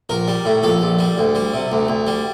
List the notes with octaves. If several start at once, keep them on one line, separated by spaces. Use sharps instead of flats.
A#1 A#4
G3
A2
A#1 A4
A#1
G3
D2
G3
C3
D2
D2
G3